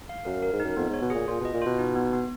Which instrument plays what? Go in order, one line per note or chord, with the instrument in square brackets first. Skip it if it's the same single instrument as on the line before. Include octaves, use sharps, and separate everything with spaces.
[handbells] F5
[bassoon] F#2 [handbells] A#4
[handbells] A#4
[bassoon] G#2
[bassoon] F#2 [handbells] D#4
[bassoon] F2 [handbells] B3
[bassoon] G#2 [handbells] C#5
[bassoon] B2
[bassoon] A#2 [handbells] G#4
[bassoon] A#2 [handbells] F4
[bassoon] B2 [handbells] D#5
[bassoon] A#2
[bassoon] B2 [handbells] F4
[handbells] D#4
B3
B3